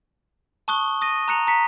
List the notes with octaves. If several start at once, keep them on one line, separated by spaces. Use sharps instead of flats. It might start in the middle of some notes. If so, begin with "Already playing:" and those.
A5 C#6 D#6 F#6 G7
D#6 A#6 D#7
A#5 F#6 C#7 F7
A#5 B6 C#7